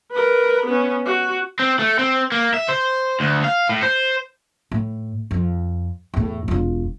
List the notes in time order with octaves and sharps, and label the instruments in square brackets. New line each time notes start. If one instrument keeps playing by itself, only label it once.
[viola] A#4 B4
B3 C#4
F#4
[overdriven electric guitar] C4
A3
C4
A#3
E5
C5
D2
F5
A2
C5
[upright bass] A2
F2
E2 A2
E1 F4